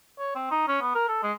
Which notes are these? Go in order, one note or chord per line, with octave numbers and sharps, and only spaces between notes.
C#5
C4
D#4
C#4
B3
A#4
A4
G#3